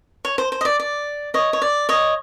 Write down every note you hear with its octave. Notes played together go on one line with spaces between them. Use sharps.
C#5
C5
C5
D#5
D5
D5
C#5 D#5
C#5
D5
C#5 D#5